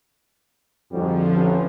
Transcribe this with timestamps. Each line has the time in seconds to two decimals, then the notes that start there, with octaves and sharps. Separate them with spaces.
0.91 F2 G#2 D3 F3 G3 F#4
1.27 A1